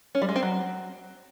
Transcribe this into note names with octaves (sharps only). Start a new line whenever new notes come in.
C#4
G3
G#3
C4
F#3